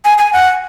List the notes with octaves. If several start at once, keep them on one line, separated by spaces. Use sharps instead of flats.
G#5
G#5
F#5